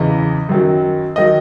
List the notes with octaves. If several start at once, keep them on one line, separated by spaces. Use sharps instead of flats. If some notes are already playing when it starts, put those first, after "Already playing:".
Already playing: E2 C#3 E3 D#5
F#2 D#3 F#3
D#3 F#3 D#5